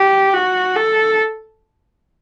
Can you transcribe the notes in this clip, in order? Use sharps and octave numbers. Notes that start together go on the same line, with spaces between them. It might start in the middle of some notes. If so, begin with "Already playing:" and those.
Already playing: G4
F#4
A4